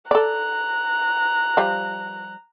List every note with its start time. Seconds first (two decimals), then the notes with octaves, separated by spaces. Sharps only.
0.11 A4 D5 A#5 F#6
1.57 F3 G3